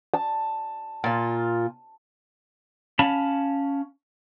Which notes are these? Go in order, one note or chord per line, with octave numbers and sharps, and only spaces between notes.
A5
A#2 F4
C#4 F5 A5 B5